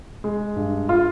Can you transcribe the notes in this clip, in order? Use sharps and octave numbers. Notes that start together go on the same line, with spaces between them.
G#3
G2
F4